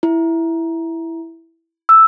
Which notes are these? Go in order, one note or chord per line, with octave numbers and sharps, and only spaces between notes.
E4
E6